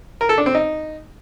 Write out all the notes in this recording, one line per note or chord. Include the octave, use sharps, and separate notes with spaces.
A#4
A4
D4
C4
D#4